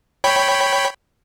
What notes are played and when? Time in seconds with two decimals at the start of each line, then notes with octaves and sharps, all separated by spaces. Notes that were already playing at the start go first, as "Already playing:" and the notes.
0.24 C#5 G5 B5